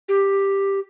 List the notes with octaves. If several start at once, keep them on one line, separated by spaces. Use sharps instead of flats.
G4